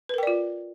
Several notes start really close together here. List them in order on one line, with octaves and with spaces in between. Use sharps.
B4 A#4 G5 D5 F4